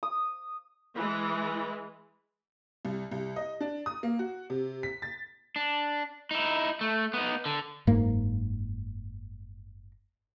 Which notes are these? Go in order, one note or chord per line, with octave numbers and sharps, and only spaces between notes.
D#6
E3 G#3
C2
C2
D#5
D4
D#6
A#3
F#4
C3
B6
A6
D4
D#4 E4
A3
B3 D#4
D3
F#1 G#2 A#3